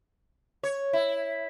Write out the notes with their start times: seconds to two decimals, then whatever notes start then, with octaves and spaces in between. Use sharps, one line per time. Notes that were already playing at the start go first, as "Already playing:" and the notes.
0.63 C#5
0.93 E4